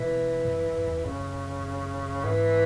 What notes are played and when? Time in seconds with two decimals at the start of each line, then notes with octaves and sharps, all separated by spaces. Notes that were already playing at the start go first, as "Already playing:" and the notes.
Already playing: B2 E3
0.45 F#2
0.77 F#2
0.85 E2
1.05 F#2 C#3
2.24 G#2 E3